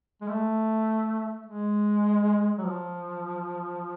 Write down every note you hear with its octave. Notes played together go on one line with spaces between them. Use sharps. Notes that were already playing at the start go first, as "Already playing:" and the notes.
G#3
A3
G#3
F#3
F3